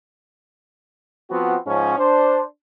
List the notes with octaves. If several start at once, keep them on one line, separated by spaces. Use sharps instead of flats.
F3 B3 C4 F#4
G#2 F3 C#4
D4 C5